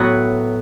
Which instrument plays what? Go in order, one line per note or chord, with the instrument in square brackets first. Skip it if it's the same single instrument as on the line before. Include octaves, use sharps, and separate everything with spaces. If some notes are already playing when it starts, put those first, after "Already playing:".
Already playing: [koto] A2 F#3 B3 F#4